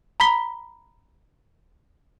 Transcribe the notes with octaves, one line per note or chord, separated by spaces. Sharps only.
A#5 B5 B6 G7